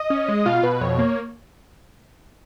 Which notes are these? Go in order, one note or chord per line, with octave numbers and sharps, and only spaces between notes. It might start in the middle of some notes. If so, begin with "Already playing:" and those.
Already playing: D#5 D#6
C#4
G#3
B2 F4 F5
B2 B4
F2 C#5
A#3